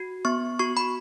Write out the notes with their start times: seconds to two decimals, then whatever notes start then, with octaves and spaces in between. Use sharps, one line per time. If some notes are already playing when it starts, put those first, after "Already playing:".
Already playing: F#4
0.25 B3 C#6
0.59 F#4 C#6
0.77 B5